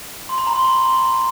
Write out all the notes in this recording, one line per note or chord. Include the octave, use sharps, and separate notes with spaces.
C6
B5
A#5
C6
B5